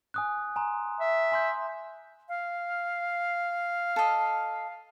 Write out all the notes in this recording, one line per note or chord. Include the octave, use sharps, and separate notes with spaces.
G#5 D#6 F#6
G#5 A#5 C6
E5
G#5 C6 G6
F5
A4 D#5